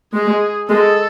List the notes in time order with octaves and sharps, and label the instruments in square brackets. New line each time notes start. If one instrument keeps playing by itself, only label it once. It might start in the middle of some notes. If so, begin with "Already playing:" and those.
[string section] G#3 [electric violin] G#4
[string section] G#3 [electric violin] A4